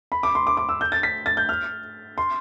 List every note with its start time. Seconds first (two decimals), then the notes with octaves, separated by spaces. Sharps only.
0.12 B5
0.23 D6
0.35 C6
0.47 D6
0.57 D6
0.69 E6
0.81 G6
0.92 A6
1.03 B6
1.26 A6
1.37 G6
1.49 F6
2.18 C6